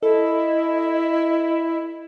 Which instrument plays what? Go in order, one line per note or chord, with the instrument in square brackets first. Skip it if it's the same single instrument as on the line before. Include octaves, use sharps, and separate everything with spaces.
[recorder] E4 [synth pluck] A4 [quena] D#5